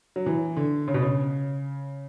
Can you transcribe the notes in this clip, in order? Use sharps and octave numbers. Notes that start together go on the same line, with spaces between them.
F#3
E3
D3
C#3
B2
C#3